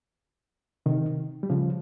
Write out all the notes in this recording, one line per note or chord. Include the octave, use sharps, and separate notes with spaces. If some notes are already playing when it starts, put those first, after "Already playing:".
C3 D#3
G3
C#3 F3